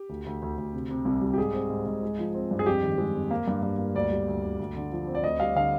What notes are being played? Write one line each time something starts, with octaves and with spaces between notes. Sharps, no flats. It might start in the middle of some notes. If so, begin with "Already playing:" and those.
Already playing: G4
D2
D2
D2
D2
C3
C3
C2
G3
G4
G#2 G#4
C4
G#2
G#2
G#3
F3
C4
G2
G#4
F2 G4
D#3
G#3
F2
A#3
G2
G2
A#3
D2 D5
G3
D2
D2
D2
D3
F3
C4
D5
D2 D#5
G3 F5
D3 F5